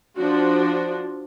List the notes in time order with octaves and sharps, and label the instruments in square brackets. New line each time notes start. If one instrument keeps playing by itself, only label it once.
[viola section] F3 D4 F#4